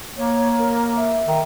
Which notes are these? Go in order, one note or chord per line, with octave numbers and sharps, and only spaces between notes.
A#3 C#5
A#4
E5
D#3